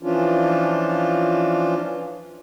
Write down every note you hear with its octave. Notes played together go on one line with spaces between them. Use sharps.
E3 F3 C#4 D4 F4